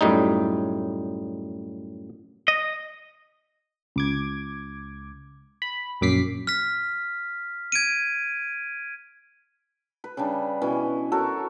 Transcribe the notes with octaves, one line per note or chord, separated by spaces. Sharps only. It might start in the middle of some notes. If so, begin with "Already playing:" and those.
F#2 A2 G3 D#4
D#5
C#2 D6 G#6
B5
A#1 F#2 D6 B6 C7
F6 B6
G#6 D7 D#7
B4
C#3 G3 D4
B2 E3 C#4
F#4 A4 A#4 C#5